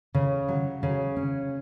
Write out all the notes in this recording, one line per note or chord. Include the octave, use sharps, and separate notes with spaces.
C#3
F#3
C#3
C#4